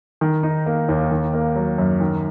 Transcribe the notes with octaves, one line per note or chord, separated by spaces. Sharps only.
D#3
D#4
A#3
D#2
D#3
A#3
F#3
F#2
D#3